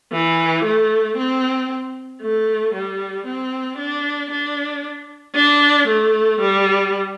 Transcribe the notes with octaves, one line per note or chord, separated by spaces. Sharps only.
E3
A3
C4
A3
G3
C4
D4
D4
D4
A3
G3